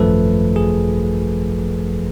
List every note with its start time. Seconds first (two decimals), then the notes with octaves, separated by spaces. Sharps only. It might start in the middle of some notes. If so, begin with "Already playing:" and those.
Already playing: G#1 F#2 F3 A3 A4 B4
0.56 G#4